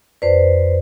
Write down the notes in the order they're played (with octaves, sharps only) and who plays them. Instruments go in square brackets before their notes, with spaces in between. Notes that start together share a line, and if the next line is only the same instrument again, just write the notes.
[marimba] F2 D5 [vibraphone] B4 C5